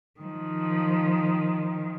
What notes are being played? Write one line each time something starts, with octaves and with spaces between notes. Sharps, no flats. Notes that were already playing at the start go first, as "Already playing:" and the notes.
D#3 F3